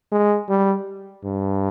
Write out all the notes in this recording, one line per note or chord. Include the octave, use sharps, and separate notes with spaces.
G#3
G3
G2